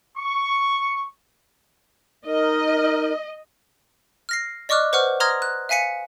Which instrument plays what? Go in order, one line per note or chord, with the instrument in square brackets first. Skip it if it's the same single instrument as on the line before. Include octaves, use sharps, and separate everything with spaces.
[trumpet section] C#6
[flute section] D#4 A#4 [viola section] D#5
[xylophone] F6 A#6 C7
D5 D#5 C#6 D6 F6 F#6
B4 C5 F#5 C#6 F6
A#5 C6 D#6 F6 G#6 A#6
F#6
E5 F5 G#5 B6 C#7